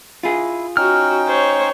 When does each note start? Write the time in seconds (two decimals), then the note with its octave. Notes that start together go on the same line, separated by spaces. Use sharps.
0.23 E4 F4 G#4
0.77 C#4 D#4 F#4 G5 F6
1.28 C5 C#5